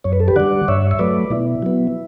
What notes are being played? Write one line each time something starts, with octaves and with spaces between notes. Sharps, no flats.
F#2 C#5
B4
A4
G4 B4
D3 G3 D5 F#5
G2 C#5 E5
E5
F#3 A3 B4 D5
B2 E4
F#3 B3